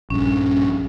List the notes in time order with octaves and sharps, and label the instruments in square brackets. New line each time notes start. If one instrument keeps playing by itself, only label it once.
[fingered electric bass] A#1 G2 [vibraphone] C#4